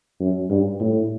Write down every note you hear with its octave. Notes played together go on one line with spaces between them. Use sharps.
F#2
G2
A2